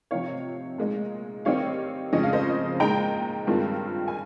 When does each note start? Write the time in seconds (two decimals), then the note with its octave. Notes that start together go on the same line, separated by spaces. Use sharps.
0.11 C3 F3 C4 D#4 C#5 F5
0.78 A#2 G#3 D#4
1.45 D#3 G3 C4 D#4 C#5 F5
2.13 F2 C#3 F3 G#3 C#4 D#5
2.23 F5
2.33 C5 D#5
2.80 A#2 G#3 D#4 G5 A#5
3.47 G2 D#3 G#3 C4 F4
4.08 G#5